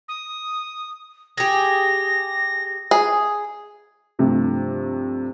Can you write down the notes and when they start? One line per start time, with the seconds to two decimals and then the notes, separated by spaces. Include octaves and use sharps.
0.09 D#6
1.37 G4 G#4 A#6
2.91 G#4
4.19 G2 C3 F3 A3